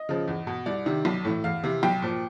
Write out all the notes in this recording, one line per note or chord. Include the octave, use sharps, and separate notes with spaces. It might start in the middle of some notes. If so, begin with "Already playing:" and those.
Already playing: D#5
C#3 F3
E2
B2
C2 D5
C3 D#3
B1
A2 E3
E2 F5
C3 E3
B1 G5
A#2 F3